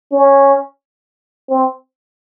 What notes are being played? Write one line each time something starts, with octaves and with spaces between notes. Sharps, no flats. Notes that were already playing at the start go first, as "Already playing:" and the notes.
C#4
C4